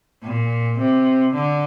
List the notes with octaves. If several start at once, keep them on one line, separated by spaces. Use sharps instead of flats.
A#2
C3
D3